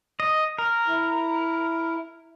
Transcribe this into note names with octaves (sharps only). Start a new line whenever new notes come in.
D#5
A#4
E4